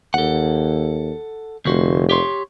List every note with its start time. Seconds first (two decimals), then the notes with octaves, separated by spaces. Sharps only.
0.14 D#2 A4 F#5
1.65 F1 D2 F#4 C5
2.09 G4 C#5 C6